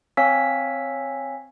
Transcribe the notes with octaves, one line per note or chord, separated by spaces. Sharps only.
C4 C#5 F5 G#5 E6 B6